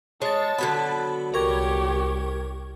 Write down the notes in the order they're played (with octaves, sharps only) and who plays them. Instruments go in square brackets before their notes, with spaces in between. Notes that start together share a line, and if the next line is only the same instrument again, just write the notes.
[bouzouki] G#3 [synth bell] C#5 A6 [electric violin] A5
[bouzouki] D3 F#3 B3 [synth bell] B5
[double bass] C2 [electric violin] G4 C#5 [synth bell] A#4 C#6 G#6